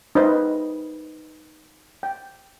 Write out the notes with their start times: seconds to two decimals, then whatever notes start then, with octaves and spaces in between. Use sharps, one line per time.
0.15 D#4 B4 C5 D#5 E5
2.03 G5